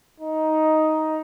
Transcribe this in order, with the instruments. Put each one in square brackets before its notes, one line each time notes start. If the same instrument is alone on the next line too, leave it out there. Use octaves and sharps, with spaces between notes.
[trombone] D#4